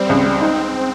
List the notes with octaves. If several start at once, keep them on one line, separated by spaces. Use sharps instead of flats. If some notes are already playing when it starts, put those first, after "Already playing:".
Already playing: G3 C4
C#2
G3
D#4